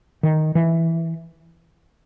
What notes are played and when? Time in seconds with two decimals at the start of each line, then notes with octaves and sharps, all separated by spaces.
0.23 D#3
0.55 E3